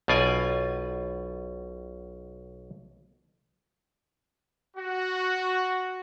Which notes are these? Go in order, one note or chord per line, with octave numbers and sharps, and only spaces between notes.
B1 B2 F4 D5 G#5
F#4